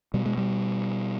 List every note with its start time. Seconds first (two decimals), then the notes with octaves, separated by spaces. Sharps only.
0.14 B2 G3
0.26 G#3
0.38 G3